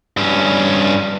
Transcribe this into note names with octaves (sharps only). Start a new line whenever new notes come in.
G2 C#4